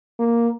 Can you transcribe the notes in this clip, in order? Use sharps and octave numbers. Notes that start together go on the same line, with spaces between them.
A#3